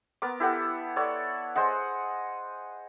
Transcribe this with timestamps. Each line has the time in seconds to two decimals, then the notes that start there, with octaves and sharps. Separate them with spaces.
0.22 B3 A#4 D6
0.40 E4 G4 A4 F#5
0.96 A4 C#5 D5 F#5
1.56 G#4 C5 D#5 F#5